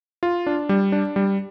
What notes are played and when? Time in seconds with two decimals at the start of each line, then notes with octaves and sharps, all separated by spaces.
0.23 F4
0.47 D4
0.69 G3
0.92 D4
1.16 G3